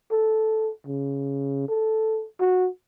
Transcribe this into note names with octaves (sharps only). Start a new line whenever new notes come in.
A4
C#3
A4
F#4